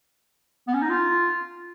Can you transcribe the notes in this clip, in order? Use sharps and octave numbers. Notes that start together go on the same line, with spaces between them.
B3
C#4
D#4
F4